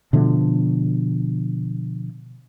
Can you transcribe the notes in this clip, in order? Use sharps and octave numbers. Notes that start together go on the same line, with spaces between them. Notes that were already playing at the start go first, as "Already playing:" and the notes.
B2 D3 F3 A3